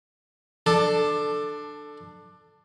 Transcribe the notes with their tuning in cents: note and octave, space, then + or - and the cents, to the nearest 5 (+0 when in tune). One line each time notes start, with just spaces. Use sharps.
D4 +15 A4 +0